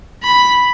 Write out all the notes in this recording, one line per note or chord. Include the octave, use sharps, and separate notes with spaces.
B5